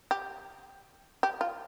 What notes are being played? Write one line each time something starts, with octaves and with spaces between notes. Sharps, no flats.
G4
G4
F4